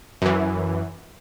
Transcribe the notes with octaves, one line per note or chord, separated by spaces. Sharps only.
F#2 E3